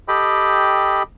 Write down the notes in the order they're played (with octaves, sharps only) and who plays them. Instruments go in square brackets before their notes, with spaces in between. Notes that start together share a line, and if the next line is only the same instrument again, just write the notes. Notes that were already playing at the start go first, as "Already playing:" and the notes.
[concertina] G4 A4 D#5 G5 B5